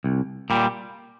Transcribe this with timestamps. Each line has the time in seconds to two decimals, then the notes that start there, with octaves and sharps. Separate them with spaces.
0.04 C2
0.50 A#2 G3